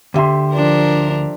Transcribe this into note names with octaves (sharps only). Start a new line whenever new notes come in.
D2 D3 G4 E5 C6
F3 D4 A#4